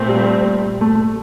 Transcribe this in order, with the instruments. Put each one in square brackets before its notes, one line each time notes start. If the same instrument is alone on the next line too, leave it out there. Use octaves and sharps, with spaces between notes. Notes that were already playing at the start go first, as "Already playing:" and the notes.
Already playing: [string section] A#2 A3 C4
[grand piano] G3
A3
A3